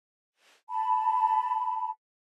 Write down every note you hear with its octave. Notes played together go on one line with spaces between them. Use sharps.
A5 B5